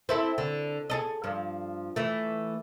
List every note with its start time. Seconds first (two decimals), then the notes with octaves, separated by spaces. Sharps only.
0.09 C4 E4 A4
0.38 D3
0.90 G#4 A4 D#5
1.24 G2 F3
1.96 E3 A3